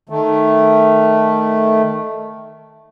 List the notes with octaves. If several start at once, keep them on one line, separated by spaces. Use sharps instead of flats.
D#3 A3